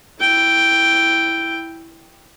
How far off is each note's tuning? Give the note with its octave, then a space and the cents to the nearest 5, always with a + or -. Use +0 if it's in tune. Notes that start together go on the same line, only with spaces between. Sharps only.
E4 +0 G5 +0